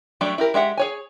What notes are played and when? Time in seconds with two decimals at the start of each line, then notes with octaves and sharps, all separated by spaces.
0.21 F#3 G3 A3 D4 G4
0.38 E4 G4 A#4
0.54 G#3 G4 E5 F#5
0.77 G#4 C#5 G#5